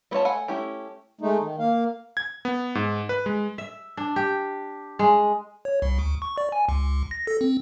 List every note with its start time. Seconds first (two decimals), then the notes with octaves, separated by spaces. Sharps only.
0.11 G3 B3 F4 C#5 A5
0.25 A3 F#5 G#5 B5
0.48 A3 C#4 E4 G4
1.21 G#3 A3 D#4
1.40 D#3
1.59 A#3 F5
2.17 G#6
2.45 B3
2.75 G#2
3.09 B4
3.26 G#3
3.58 E5
3.97 D4
4.16 G4
4.99 G#3
5.65 C#5
5.82 C2
5.99 D2
6.22 C#6
6.38 D5
6.52 G#5
6.69 C#2
7.11 A#6
7.27 A4
7.41 C4